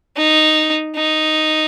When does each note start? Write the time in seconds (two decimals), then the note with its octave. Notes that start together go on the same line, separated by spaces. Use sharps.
0.17 D#4
0.96 D#4